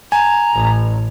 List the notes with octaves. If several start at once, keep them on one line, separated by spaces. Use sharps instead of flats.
G#5 A#5
A1